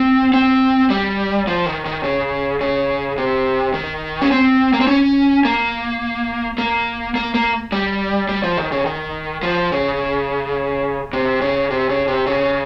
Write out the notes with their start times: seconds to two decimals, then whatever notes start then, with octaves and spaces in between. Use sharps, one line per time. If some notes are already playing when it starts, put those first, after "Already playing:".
Already playing: C4
0.34 C4
0.90 G3
1.47 F3
1.66 D#3
1.85 D#3
2.04 C#3
2.61 C#3
3.18 C3
3.74 D#3
4.21 C#4
4.32 C4
4.73 A#3
4.81 C4
4.88 C#4
5.45 A#3
6.58 A#3
7.15 A#3
7.35 A#3
7.72 G3
8.29 G3
8.44 F3
8.58 D#3
8.72 C#3
8.86 D#3
9.43 F3
9.72 C#3
11.13 C3
11.41 C#3
11.71 C3
11.89 C#3
12.08 C3
12.26 C#3